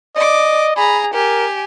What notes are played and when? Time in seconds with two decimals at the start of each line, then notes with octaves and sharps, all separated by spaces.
0.16 D5 D#5 D6
0.76 G#4 A#5 B5
1.14 G4 A#4 G#5